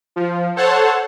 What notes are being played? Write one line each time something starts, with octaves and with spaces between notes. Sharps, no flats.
F3
A4 C5 C#5 F#5 A5